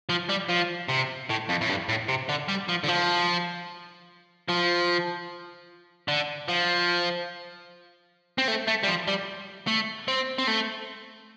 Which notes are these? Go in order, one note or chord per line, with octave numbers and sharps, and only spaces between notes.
F3
G3
F3
C3
A2
F2
A2
G2
A2
C3
D3
G3
F3
D3
F3
F3
D3
F3
C4
A3
A3
G3
F3
G3
A3
C4
C4
A3